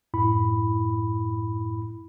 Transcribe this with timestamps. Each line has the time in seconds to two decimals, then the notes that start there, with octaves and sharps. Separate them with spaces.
0.14 F#2 A2 E4 B5